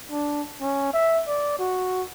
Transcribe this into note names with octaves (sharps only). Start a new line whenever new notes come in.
D4
C#4
E5
D5
F#4